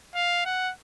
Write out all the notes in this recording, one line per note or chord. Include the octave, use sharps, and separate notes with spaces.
F5
F#5